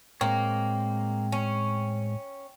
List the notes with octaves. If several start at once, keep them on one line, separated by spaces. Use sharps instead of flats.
A2 G#3 A#3 C4 C#5 G5
C#4